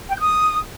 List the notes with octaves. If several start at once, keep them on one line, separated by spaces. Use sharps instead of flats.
G5
G6
D#6